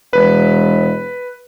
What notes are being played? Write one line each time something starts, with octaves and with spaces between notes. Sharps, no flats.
E1 B4